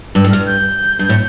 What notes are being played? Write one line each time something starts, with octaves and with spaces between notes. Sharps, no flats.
G2 E6
A2
G2 F6
G6
G2
A2